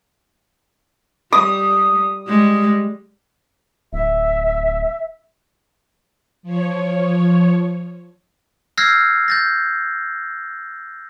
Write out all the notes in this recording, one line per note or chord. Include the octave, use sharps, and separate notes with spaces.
G3 D#6
G3 G#3
D1 E5
F3 C#5
E6 F6 G6 G#6 A#6 C7
G6 A6 A#6